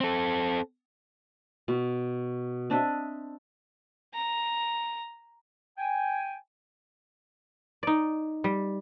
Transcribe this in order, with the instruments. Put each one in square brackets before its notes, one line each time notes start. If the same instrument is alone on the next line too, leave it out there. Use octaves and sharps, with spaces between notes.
[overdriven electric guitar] C4 A4
[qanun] B2
C4 D4 D#5 E5
[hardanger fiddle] A#5
[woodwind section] G5 G#5
[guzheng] D#4 D5
G3